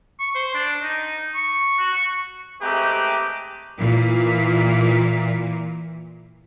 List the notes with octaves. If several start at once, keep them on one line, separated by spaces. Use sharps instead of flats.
C#6
C5
D4
D#4
C#6
F#4
C#6
G#3 A3 C4 G4 B4 A#5
A#2 E3